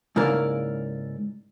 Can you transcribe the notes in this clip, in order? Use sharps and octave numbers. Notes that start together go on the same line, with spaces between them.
G#2 C#3 A#3 E4 A#4 D5